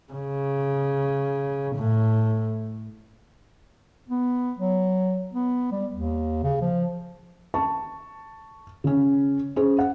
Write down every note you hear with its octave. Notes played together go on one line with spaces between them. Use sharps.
C#3
A2
B3
F#3
B3
G3
D#2
C#3
F3
A5 C#6
C#3 C#4
C#4 G#4 C5
F#5